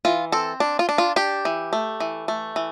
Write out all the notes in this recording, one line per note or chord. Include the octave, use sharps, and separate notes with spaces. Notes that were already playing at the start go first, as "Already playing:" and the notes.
E3 F4
C4 A4
D4
F4
D4
F4
D4 G4
E3
A3
E3
A3
E3